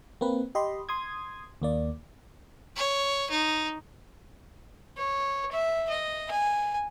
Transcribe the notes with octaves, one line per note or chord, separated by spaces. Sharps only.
A#3 C4 B4
G4 D#5 B5 C6
C6 D#6 G#6
D#2 A#3 D5
C#5
D#4
C#5
E5
D#5
G#5